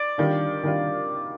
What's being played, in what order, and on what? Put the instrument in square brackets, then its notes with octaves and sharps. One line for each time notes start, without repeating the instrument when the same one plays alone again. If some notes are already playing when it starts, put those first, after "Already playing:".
Already playing: [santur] D5
[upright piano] D#3 G3 D4 F4
D#3 G3 D4 F4